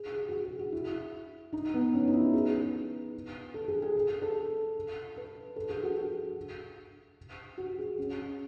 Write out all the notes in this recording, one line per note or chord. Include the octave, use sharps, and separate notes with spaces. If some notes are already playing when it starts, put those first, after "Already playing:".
Already playing: G#4
G#4
F#4
G#4
G#4
F#4
E4
D#4
B3
C#4
D#4
E4
F#4
G#4
G#4
B4
A4
G#4
G#4
A4
B4
A4
G#4
F#4
F#4
F#4
G#4
C#4